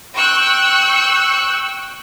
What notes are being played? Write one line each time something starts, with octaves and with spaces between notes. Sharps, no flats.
G5 C#6 E6 F#6 G6